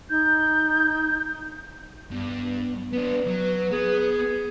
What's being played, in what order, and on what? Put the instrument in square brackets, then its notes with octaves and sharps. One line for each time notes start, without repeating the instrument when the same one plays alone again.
[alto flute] D#4 [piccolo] G6
[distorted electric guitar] G2 [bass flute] B3
[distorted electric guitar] B3 D4 [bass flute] B4
[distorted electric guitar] F#3
[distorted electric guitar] B3 [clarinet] G#4